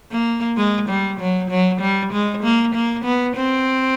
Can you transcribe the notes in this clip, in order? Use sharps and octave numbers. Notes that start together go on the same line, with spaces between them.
A#3
G#3
G3
F#3
F#3
G3
G#3
A#3
A#3
B3
C4